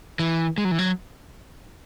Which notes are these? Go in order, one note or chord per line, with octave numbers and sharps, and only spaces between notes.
E3
G#3
F#3
E3
F#3